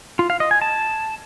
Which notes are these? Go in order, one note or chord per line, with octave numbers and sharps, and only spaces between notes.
F4
F5
D#5
G#5
A5